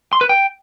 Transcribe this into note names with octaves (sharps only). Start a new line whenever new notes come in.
C6
B4
G5